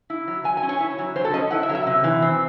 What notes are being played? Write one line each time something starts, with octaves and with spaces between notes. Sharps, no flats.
E4
F#3
F#3 G#5
G#5
C#4
C#5
E4
F#3
F#3 C5
A4
C#4 D#5
E4 F#5
E5
F#3
E5
C3
E3
C4